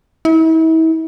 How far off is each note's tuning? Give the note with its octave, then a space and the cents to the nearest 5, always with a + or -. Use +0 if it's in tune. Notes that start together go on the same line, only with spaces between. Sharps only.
E4 -40